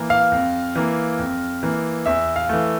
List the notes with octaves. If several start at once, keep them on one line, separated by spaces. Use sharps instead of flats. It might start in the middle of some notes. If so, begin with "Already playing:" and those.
Already playing: E3 A#3
F5
F2
E3 A#3
F2
E3 A#3
E2 E5
F5
E3 A3